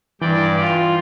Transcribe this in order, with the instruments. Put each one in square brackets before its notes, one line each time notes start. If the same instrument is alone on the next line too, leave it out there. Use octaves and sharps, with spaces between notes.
[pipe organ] G2 D5 G5 [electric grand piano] E3
[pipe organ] F4